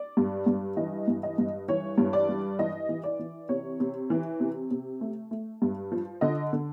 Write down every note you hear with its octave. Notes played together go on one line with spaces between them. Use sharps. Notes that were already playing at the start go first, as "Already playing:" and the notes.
Already playing: D5
G2
G2
E3 D#5
G2
D#5
G2
E3 C#5
G2
D5
G3
E3 D#5
E3
D5
E3
C3 C#5
C3
E3
C3
C3
A3
A3
G2
F3
D3 D#5
D3